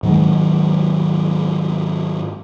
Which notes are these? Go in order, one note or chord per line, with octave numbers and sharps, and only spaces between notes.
G#2 D#3 F#3 G#3